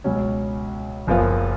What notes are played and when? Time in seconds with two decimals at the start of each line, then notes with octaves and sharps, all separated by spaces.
0.04 C#2 B2 F#3 C#4
1.07 F#1 F#2 F3 B3 F4